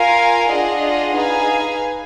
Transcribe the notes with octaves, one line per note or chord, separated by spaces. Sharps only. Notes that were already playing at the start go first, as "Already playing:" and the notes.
Already playing: F4 A#4 F5 G#5
D4 F4 G#4 D#5 F#5
D#4 G#4 B4 F5 G#5